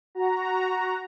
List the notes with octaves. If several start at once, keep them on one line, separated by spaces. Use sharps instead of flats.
F#4 A#5